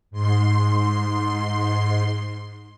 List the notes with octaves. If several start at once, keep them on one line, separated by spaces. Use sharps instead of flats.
G#2 C6